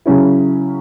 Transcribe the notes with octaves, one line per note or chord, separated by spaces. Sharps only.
C#3 F#3 C#4 E4